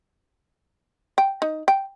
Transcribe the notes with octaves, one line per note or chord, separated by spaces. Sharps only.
G5
D#4
G5